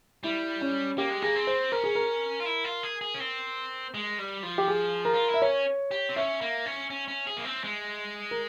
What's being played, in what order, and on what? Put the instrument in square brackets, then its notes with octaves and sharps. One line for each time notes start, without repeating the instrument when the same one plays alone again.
[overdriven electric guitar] G3 [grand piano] E4
[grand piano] C#4
[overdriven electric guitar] A#3 [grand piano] G4
[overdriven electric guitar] G#3
[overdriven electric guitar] A#3 [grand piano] G#4
[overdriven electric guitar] C4
[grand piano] C5
[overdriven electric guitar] C#4 [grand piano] A#4
[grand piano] G#4
A#4
[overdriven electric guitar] F4
E4
F4
G#4
G#4
C#4
C4
G#3
G3
F3
[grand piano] G4
G#4
A#4
[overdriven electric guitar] F4
E4
[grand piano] E5
[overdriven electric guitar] C#4 [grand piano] C#5
[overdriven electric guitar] G4
C4
[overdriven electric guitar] C#4 [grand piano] E5
[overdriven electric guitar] A#3
C#4
C#4
C#4
G#4
A#3
C4
G#3
[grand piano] A#4